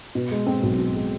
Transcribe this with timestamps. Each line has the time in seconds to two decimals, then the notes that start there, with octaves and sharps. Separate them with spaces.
0.15 B2
0.31 G#3
0.47 C4
0.63 B1
0.78 B2
0.95 G#3